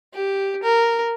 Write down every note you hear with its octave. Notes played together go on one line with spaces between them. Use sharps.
G4
A#4